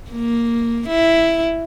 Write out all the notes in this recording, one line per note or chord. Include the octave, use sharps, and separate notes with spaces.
A#3
E4